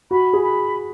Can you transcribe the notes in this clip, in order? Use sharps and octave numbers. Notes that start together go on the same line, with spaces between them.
F#4 B5
G#4
B5